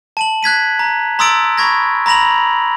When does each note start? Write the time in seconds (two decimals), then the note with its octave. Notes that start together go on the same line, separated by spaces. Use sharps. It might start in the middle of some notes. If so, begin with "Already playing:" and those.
0.17 A5 D#7 F#7
0.43 F#6 G#6 B6 D#7
0.79 A#5
1.19 A#5 C6 D#6 E6 A6 D7
1.58 B5 C#6 G#6 A#6
2.06 A#5 B5 A#6 F7 F#7